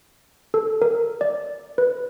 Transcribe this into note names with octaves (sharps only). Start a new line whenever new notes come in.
A4
A#4
D5
B4